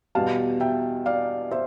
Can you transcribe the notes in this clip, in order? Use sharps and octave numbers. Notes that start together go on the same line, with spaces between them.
E2 B2 G3 F5 A5
E5 G5
D5 F5
C5 E5